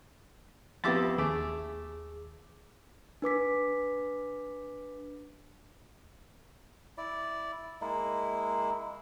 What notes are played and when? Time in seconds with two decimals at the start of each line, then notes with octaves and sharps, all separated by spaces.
0.84 F2 B3 E4 G4 D6 A6
1.18 D#2 A3 G#4 D6
3.22 D4 B4 D6 B6
6.97 E4 D5
7.81 G#3 A#3 E4